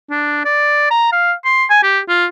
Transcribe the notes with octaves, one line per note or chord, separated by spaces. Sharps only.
D4
D5
A#5
F5
C6
G#5
G4
F4